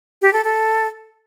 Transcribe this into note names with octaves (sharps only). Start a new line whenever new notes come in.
G4
A4
A4